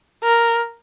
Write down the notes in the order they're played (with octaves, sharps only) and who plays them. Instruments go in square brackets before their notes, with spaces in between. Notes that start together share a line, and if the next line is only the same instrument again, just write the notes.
[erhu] A#4